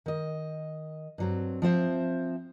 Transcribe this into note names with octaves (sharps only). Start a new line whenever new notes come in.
D#3 D#5
G2 F#3 C4
F3 C4 C5 E5